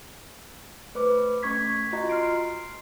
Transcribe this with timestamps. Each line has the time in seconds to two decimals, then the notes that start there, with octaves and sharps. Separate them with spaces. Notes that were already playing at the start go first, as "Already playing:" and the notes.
0.95 A3 B4 C5 D6
1.43 A3 C#4 C#6 G#6 B6
1.92 F4 F#4 D#5 A#5
2.09 C6 F6 C7 D7